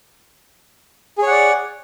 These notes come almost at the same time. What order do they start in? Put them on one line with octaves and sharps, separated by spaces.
G#4 C#5 F#5 D5